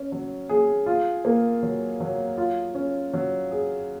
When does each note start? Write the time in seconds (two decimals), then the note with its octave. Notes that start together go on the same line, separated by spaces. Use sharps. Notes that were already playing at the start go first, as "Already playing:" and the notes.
Already playing: C#4
0.12 F#3
0.49 G#4
0.86 F4
1.25 A#3
1.63 F#3
2.00 F#3
2.38 F4
2.75 C#4
3.14 F#3
3.51 G#4